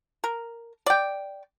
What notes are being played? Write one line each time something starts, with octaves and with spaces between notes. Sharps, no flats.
A#4
D5 G5